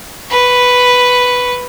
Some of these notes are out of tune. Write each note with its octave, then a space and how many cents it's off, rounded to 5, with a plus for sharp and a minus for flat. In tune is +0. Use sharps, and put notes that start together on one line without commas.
B4 +0 C#6 +0